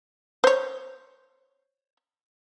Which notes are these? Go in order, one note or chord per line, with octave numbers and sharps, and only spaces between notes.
C5 C#5